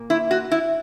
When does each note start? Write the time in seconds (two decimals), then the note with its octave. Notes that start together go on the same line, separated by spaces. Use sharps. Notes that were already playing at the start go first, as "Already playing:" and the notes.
Already playing: A#2 A#3
0.10 E4
0.31 F#4
0.51 E4